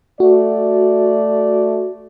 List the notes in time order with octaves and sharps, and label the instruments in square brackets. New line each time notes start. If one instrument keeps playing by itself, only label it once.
[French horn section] A3 D5 [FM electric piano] F#4